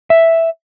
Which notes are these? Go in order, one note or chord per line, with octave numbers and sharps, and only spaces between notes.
E5